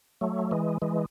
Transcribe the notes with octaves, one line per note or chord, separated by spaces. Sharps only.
F#3 A3
E3 G#3
E3 G#3